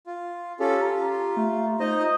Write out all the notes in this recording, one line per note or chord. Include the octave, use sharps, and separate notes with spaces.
F4
C#4 F4 G4 A4
F4 A#5
A3
D#4 C5 D#5
F4 D#6